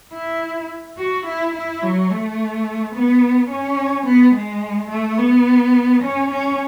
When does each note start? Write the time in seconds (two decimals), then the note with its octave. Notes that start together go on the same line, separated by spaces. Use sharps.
0.14 E4
0.98 F#4
1.26 E4
1.55 E4
1.82 F#3
2.10 A3
2.95 B3
3.50 C#4
4.06 B3
4.35 G#3
4.91 A3
5.19 B3
6.03 C#4
6.31 C#4